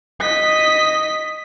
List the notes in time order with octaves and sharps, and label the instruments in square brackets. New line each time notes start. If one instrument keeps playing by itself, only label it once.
[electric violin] D#5 B6